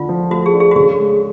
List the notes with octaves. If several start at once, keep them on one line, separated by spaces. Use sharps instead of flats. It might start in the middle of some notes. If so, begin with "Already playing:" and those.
Already playing: D3 A3 D4 F4
F3
A3 F#4
G#4
D4
G#4
F#4
C#3 G#4
G#3